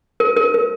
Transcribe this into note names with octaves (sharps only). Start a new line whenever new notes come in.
A#4
A#4
A#4